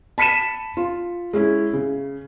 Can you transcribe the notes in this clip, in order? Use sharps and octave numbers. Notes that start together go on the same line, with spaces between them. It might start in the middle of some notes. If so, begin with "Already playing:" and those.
A5 B5 B6 C#7 D#7 E7
F4
G#3 C#4 E4
C#3